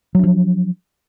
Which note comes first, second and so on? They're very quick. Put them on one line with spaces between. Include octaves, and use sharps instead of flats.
F#3 D4 F3